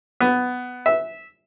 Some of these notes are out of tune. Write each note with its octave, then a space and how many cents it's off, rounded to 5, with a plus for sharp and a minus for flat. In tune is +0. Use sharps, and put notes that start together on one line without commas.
B3 +10
E5 -15